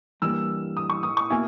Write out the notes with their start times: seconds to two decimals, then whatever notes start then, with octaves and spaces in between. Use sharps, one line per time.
0.22 G2 E3 G3 A#3 E6
0.77 D#6
0.90 C#6
1.03 D#6
1.17 C#6
1.30 B2 A#3 E4 G#5